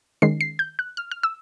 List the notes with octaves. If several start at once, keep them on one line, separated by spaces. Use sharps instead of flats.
D#3 G#3 C#4 C7
C7
G6
F#6
F6
F6
E6